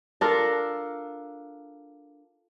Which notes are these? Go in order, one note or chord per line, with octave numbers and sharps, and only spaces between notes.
D4 F4 A4 A#4